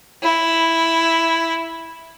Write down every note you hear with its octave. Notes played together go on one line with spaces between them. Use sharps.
E4